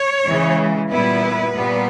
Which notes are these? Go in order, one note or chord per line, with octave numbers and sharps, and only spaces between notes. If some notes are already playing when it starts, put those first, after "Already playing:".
Already playing: C#5
C#3 E3 G#3
A#2 G3 B3 E4 B4
A#2 G3 B3